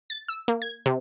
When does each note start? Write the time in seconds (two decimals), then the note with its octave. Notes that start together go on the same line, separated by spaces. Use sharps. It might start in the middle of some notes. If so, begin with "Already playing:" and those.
0.10 A6
0.28 E6
0.48 A#3
0.62 G#6
0.86 C3